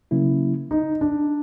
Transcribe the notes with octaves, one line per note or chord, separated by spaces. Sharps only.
C#3 F#3 A#3 C#4 E4
D#4
D4